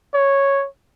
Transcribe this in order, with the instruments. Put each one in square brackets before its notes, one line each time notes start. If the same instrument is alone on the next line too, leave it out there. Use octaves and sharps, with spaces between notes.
[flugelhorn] C#5